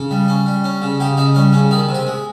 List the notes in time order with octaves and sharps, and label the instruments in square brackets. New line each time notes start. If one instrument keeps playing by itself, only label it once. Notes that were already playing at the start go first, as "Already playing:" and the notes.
Already playing: [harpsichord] C#3
G3
C#4
G3
C#4
C#3
C#3 G4
C#3 D#4
G3 C#4
C#3 C#4
D#3 D#4
C3
G4
G#3